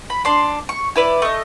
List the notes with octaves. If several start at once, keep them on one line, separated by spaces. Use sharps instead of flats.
B5
D4 D5 C6
C#6
E4 B4 D5
A3 D#5